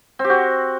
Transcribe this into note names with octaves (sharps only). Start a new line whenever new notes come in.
C4
G4
F#4